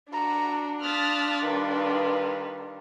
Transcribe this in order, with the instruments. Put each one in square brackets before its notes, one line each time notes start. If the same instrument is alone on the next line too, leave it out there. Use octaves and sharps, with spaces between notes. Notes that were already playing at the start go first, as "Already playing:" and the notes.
[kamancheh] D4 [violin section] F#4 [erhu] A#5
[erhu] F4 [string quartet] A5 D#6 F#6 [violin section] F6 A6 B6
[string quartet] D#3 G3 [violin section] B4